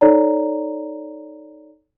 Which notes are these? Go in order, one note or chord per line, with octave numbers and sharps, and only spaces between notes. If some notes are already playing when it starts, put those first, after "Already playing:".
D#4 A4 C#5 D5 A#5